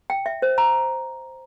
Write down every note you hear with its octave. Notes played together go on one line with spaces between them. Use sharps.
G5
E5
C5
A#5